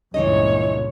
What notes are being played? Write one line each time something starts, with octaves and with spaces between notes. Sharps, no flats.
C#2 G2 A#2 E3 D#4 C#5 D#5